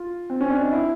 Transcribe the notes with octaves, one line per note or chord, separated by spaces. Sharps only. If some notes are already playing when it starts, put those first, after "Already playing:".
Already playing: F4
C4
C#4
D4
D#4
E4